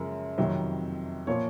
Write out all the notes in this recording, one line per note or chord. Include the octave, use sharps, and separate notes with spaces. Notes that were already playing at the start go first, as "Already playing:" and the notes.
Already playing: F#2 C#3 F3 G#3 A#4
F2 C3 D#3 F#3
A#2 F3 A#3 C#5